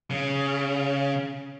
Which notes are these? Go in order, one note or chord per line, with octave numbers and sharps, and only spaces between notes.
C#3